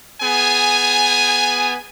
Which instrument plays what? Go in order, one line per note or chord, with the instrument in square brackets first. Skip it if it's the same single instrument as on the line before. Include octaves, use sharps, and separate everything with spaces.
[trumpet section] B3 G#4 G#5